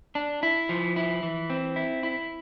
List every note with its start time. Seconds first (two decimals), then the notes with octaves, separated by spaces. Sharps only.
0.15 D4
0.43 E4
0.69 F3
0.96 E4
1.23 E3
1.50 C4
1.76 E4
2.03 E4